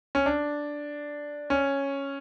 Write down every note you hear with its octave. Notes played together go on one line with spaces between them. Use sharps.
C#4
D4
C#4